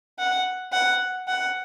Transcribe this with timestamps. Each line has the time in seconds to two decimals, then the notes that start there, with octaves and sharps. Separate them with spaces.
0.19 F#5
0.73 F#5
1.28 F#5